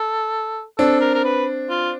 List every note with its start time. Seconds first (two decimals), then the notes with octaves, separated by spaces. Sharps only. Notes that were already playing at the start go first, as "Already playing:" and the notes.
Already playing: A4
0.78 C4 D4 A4
1.01 A#4
1.15 A#4
1.24 B4
1.70 F4